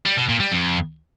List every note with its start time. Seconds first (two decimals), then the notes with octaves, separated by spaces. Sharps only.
0.06 G3
0.17 B2
0.29 A#2
0.40 G3
0.52 F2